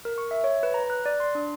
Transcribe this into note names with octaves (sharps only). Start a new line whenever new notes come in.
A#4
C#6
E5
C#5
B4
A#5
F#6
D5
C6
D4